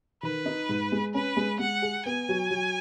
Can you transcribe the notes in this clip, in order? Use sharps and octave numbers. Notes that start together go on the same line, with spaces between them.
D#3 B4
D#4
G#2
G#3
C#4 B4
G#3
G#3 F#5
G#4
B3 G#5
F#3
F#3